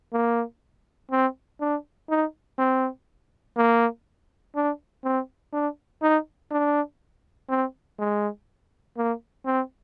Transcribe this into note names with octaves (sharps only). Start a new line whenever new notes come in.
A#3
C4
D4
D#4
C4
A#3
D4
C4
D4
D#4
D4
C4
G#3
A#3
C4